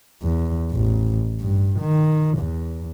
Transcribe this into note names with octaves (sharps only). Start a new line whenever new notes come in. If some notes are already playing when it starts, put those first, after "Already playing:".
E2
A1
G2
D#3
E2